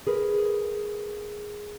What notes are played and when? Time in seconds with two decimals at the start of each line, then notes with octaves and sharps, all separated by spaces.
0.07 G#4 A#4 B4